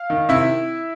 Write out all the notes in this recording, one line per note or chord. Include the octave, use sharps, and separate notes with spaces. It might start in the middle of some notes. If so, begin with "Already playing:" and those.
Already playing: F5
D#3
C3 E4 E5